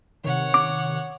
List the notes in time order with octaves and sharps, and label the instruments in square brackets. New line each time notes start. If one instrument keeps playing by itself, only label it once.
[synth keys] C3 D#3 [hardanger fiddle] C#5 F#5
[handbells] D6